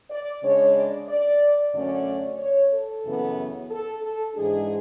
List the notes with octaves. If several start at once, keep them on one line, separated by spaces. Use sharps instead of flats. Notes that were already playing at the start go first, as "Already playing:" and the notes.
D5
C#3 G#3 D4 C#5
D5
D5
F#2 D3 A3 C#4 D5
C#5
A4
F#2 C#3 E3 B3
A4
A4
G#2 E3 G#3 D4 G#4